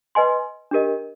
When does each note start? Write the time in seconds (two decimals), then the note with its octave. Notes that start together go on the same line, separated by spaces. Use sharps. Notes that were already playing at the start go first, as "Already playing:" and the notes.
0.15 B4 D#5 G#5 C6
0.71 D4 G4 A#4 D#5